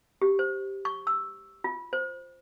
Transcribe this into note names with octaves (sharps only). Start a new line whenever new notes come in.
G4
C5
C#6
E6
F4
C5